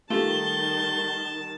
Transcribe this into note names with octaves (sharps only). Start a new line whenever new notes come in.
D#3 G3 A3 F4 G4 A5 G7